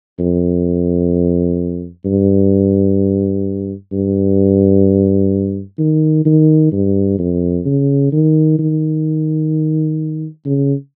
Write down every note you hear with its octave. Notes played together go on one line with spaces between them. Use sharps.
F2
G2
G2
D#3
D#3
G2
F2
C#3
D#3
D#3
C#3